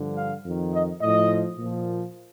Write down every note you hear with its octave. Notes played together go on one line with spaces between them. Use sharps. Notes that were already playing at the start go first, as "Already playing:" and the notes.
Already playing: G2 D3 F3
F5
F2 D#3
D#5
A2 F3 D#5
A#2 F3